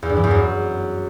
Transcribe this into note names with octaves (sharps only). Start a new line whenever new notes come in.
E2
G2
E3
E2
F#2